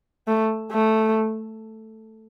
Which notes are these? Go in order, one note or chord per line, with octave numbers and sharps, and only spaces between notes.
A3
A3